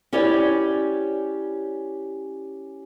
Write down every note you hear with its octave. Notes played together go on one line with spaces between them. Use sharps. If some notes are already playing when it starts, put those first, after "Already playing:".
C#4 E4 G4 C#5 D5